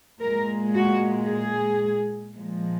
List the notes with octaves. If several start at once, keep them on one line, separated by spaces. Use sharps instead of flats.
A#2 G#3 A#4
F#4
G#4
A#2 F3 G#3